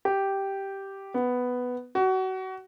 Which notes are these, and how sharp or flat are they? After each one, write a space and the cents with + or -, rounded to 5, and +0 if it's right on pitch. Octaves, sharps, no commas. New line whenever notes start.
G4 -5
B3 +5
F#4 +25